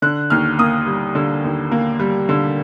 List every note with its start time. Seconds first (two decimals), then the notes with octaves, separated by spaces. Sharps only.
0.02 D3 F#6
0.30 D#2 F6
0.59 A#3 D#6
0.87 G3
1.15 D3
1.44 D#2
1.72 A#3
2.00 G3
2.29 D3